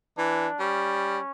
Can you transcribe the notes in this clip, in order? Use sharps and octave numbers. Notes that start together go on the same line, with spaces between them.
E3 D4
G3 C#4